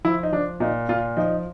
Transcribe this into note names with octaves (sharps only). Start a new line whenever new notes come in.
F3 E4
D#4
F3 D4
A#2 D#4
A#2 F4
F3 D#4